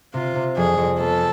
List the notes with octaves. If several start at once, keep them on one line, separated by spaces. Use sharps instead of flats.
C3 F4
C3
F2 G#4
F2
B3 A4